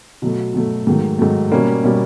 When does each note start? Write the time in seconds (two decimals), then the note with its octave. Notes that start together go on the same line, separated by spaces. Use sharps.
0.22 B2 F#3 A3
0.54 B2 F#3 A3
0.87 G#2 D#3 F#3 A3
1.19 G#2 D#3 F#3 A3
1.52 B2 G3 A#3 C#4
1.84 B2 G3 A#3 C#4